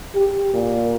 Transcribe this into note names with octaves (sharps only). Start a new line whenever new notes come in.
G4
A#2